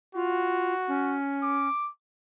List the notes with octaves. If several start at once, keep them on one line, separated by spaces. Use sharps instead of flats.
F4 F#4
C#4
D6